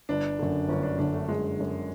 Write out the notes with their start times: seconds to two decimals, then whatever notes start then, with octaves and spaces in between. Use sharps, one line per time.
0.09 G1 D4
0.39 F#2 D3
0.68 G1 C#4
0.83 D4
0.99 F#2 D3 D4
1.13 A3
1.28 G1 G#3
1.58 F#2 D3